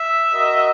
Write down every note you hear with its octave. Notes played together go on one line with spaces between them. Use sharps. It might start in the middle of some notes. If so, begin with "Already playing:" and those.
Already playing: E5
F#4 A#4 D#5